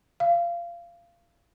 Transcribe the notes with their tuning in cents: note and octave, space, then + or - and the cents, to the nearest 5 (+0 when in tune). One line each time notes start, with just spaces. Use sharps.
F5 -20